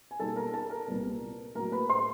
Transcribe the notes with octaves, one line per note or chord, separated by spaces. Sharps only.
G#5
B2 G3 A#3 D#4 A4 A5
A#4 A#5
A4 A5
A#4 A#5
C2 A#2 G3 B3
A2 F#3 A#3 A#4 A#5
B4 B5
C5 C6